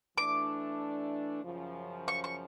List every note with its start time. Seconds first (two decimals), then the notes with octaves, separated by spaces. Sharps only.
0.16 E3 A3 D4 D6
1.44 F#2 C#3 F3
2.08 C#6
2.24 C#6